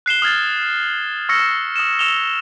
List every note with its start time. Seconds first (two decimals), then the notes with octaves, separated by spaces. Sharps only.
0.06 F#6 C7 E7 G7
0.22 D#6 F6 G#6 A6
1.29 C#6 E6 F6 A#6 C#7
1.76 D#6 E7
1.99 E6 E7 F7 G7